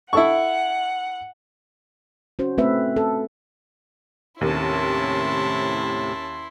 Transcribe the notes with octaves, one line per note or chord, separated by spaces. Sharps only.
E4 A4 F#5 C#6
C#4 F#4 C5
A3 C4 B4 E5
A4
D#2 A2 C3 C#4 E4 A5 C6